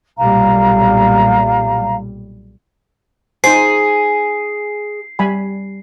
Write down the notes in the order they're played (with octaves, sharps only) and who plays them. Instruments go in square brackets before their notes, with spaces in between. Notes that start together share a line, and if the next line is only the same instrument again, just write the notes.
[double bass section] B1 A#2 G3 [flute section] F5 A#5
[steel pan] D#4 C5 [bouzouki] G#4 [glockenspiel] C7
[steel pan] G3 G#5 B5